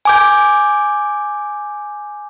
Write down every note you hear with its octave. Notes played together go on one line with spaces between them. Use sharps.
G#5 D6 G6